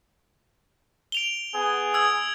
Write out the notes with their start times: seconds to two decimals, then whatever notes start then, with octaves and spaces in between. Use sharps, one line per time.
1.12 D7 F7 G7
1.54 B3 G#4
1.94 D#6 E6 G#6